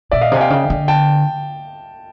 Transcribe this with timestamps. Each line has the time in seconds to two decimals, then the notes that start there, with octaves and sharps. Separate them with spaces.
0.11 A#2 D5 E5
0.21 D#5 F5
0.32 C3 G#5
0.40 F5 G5
0.50 C#3
0.70 D3
0.88 G5 A5